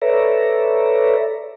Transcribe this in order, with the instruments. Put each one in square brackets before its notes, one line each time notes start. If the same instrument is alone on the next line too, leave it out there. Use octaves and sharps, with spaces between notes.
[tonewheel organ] A4 B4 C#5 D5 E5 A#5